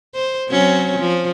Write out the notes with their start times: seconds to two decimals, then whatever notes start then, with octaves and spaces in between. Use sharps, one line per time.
0.15 C5
0.49 F#3 C4 C#4
1.00 F3